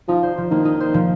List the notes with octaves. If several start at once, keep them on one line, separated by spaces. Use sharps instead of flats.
F3 D#4
C5
F3
D#3 A#3
D#4
C5
F3